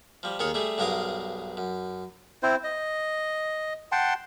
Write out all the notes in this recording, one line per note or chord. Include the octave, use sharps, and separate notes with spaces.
F3 G3
D#2 D#3 G#4 C#5 C#6
G3 A3 G#4
B1 G2 G#4 A#4 F5 D#6
F#2
C4 E4 C5
D#5
F#5 G5 A5 C6